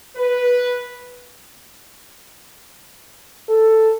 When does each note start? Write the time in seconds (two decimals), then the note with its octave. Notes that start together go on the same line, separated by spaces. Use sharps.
0.16 B4
3.49 A4